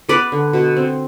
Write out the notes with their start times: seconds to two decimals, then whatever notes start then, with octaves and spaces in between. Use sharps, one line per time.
0.09 B3 B4 D5
0.32 D3
0.53 B2
0.76 C4